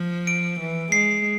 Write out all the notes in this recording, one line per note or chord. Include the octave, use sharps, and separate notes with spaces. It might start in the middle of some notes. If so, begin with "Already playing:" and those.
Already playing: F3
D7
E3
G#3 C7